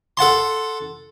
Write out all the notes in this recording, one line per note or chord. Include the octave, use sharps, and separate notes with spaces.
A4 F#5 A5 C6